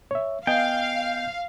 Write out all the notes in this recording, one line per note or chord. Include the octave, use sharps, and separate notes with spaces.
C#5 E5
B3 D#5 F5 G5 G#5